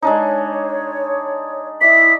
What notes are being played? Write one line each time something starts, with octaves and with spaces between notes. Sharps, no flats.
G#3 D4 D#4 C#5
E4 D5 E5 D#6 B6